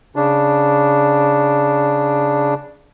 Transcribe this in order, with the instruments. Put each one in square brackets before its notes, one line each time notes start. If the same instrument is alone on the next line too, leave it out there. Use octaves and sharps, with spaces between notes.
[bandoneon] C#3 D4